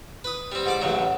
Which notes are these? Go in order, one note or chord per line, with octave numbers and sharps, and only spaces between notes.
B4 D#6
G3 C4
G#2 D5 D6
A1 C#3 F#3